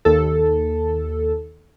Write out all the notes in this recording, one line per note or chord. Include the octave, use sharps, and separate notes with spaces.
D#2 A4